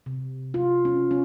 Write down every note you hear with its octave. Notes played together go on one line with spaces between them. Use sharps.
C3
F4
C#4
C#4